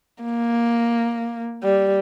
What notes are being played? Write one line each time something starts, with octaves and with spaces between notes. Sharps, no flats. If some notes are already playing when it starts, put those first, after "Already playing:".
A#3
G3